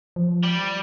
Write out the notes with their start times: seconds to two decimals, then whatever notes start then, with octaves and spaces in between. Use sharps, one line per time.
0.16 F3
0.43 G3